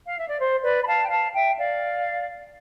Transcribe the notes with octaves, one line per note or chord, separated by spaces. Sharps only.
F5
E5
D5
C5
B4 D5
B5
F5 A5
G5
F5 A5
E5 G5
D5 F5